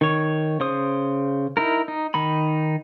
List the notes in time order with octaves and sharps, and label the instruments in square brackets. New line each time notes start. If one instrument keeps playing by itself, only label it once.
[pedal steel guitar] D#3 C#5
C#3 C5 D#6
D#4 E4 A#4
D#4
D#3 D#4 B5